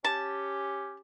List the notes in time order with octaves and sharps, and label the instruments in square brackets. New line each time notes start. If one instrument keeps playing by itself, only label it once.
[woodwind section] C#4 G4 [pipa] A5